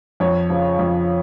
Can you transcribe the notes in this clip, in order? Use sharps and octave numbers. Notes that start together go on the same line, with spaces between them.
F2 C#5
C#3 F3
F2